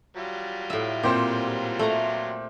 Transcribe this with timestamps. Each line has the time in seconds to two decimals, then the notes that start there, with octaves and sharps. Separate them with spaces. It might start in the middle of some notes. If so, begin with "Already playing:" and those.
0.17 F#3 G3 F4
0.70 A2 E5
1.03 A#2 C4 G4 C5
1.79 A3 A#5